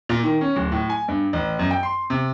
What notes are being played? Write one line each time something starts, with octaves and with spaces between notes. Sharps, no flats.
A#2
D#3
C#4
D1
A2
G#5
G2
A1
F#2
G5
C6
C3